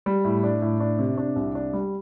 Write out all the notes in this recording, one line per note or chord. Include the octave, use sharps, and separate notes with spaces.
G3
A2
D4
A2
D4
C3
D4
C2
D4
G3